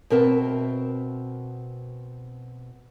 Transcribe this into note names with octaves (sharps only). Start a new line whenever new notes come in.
B2 C4 A#4 E5 A5